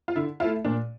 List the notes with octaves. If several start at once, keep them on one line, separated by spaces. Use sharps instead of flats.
F4
D3 E4
A3 E4 F4
A#2 D4